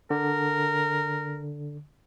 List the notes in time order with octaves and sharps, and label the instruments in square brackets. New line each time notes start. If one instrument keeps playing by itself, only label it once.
[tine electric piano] D3 [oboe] A#4